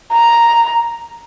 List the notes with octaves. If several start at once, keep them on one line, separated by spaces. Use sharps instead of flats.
A#5